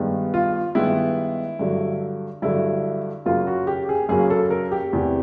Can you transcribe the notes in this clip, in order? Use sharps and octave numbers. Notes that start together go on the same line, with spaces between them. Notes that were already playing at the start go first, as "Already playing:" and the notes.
Already playing: G2 D#3 G#3 B3
F4
G2 D#3 G#3 B3 E4
G2 D3 F#3
G2 D3 F#3 E4
F#2 C#3 F#3 A#3 F4
F#4
G4
G#4
F#2 C#3 F#3 A#3 G#4
A4
A#4
G4
E2 C3 E3